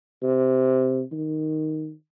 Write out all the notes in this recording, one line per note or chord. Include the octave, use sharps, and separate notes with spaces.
C3
D#3